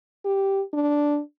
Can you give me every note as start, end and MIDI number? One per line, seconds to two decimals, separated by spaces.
0.24 0.62 67
0.74 1.20 62